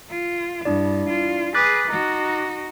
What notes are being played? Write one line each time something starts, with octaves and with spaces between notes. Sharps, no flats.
F4
G2 D4 E4 D5
F4
G#4 B4 D6 F#6 A6
D#4 F#4